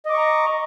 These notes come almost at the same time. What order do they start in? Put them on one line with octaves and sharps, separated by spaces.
D#5 D6 C#6 A#5